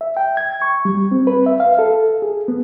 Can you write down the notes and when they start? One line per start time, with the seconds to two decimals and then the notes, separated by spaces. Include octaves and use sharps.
0.01 E5
0.17 G5
0.37 G#6
0.62 C#6
0.85 G3
1.12 C4
1.27 B4
1.46 E5
1.60 F5
1.79 A4
2.22 G#4
2.48 B3